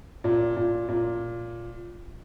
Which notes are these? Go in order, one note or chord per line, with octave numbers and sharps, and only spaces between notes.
A#2
A#2
A#2